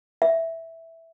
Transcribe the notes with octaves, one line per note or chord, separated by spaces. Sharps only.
E5